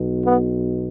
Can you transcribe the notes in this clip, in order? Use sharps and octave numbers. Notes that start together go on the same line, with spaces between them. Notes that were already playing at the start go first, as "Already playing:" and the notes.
Already playing: B1 B2
B3